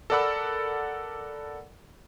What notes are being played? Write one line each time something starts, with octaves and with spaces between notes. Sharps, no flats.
A4 A#4 D5 F#5 B5 E6